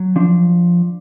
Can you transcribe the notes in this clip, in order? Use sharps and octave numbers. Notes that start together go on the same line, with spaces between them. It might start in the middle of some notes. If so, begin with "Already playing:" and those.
Already playing: F#3
F3 D4